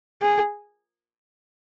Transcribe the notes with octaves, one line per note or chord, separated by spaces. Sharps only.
G#4